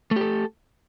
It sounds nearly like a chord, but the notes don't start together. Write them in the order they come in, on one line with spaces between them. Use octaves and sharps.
A3 G4 A4